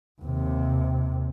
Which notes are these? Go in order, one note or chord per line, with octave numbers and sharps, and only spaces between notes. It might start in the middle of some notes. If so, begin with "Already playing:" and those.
D#2 C3